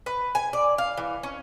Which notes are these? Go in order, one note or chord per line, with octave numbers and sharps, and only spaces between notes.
B4
G#5
D5
F5
E3
C#4